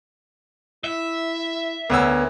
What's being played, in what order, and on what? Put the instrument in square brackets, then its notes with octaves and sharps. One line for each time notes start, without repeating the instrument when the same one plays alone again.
[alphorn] E4 [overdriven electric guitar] E5
[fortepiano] D2 C#4 E6 [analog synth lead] B3 [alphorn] A#4